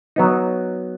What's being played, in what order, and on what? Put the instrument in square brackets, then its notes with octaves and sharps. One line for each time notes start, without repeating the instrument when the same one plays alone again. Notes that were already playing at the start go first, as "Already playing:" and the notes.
[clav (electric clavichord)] F#3 B3 D#4